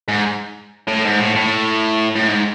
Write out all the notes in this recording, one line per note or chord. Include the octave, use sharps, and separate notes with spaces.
G#2
A2
G#2
A2
A2
A2
G#2